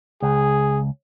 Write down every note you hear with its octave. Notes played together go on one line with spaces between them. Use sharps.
C#2 G#4